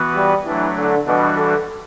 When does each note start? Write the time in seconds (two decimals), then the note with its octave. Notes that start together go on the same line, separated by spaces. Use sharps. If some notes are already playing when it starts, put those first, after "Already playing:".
Already playing: E3 B3 F#4 B4
0.15 G3
0.46 E3 F#3 A3 D4
0.77 D3
1.06 B2 E3 G3 D4 F#4
1.37 D3